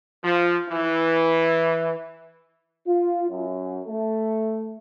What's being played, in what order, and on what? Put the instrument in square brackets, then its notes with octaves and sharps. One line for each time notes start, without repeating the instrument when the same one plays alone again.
[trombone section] F3
E3
[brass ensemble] F4
F#2
A3